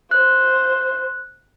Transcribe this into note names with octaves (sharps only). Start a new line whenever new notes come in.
C5 F#6